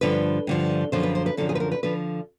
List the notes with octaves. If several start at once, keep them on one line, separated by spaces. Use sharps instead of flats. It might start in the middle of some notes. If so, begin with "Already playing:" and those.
G2 D3 F3 B4
G2 D3 F3
F#2 D3 F3 C5
B4
C5
B4
F#2 D3 F3 A4
G#4
B4
A#4
B4
D3 F3 B4